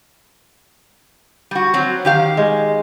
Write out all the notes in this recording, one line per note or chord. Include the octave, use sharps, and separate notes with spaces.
G3 F#4
F#3 C4
D#3 G4 F5
G#3